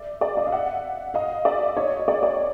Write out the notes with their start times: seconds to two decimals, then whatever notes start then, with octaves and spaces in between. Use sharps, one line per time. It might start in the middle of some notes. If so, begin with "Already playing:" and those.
Already playing: D5 E5
0.21 D5 E5
0.37 D#5 F5
0.47 F5
0.52 E5 F#5
1.14 D#5 F5
1.45 D5 E5
1.77 C#5 D#5
1.99 D#5
2.08 D5 E5
2.23 D5 E5